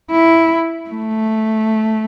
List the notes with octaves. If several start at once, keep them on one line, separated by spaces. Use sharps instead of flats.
E4
A3